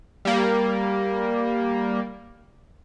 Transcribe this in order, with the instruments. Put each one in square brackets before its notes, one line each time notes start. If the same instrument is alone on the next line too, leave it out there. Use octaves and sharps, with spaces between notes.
[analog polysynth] G3 A#3